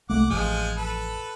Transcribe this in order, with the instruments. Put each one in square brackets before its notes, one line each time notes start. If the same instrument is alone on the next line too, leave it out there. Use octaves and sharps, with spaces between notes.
[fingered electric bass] C2 A3 A#3 [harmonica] F#5 D6
[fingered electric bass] A1 F2 [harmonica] F3 G#3 G#5
[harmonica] A4 B4